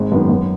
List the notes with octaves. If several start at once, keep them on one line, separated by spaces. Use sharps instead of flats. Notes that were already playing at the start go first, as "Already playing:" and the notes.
Already playing: G#1 G#3
F#2 D#3 B3
F#2 B3